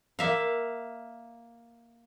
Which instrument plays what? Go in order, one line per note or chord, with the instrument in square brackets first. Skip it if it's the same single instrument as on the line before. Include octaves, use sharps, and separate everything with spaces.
[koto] A#3 E5 F5